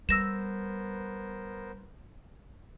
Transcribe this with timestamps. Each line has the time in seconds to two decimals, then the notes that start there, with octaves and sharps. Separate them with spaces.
0.09 G3 B3 A#4 C5 E6 A#6 E7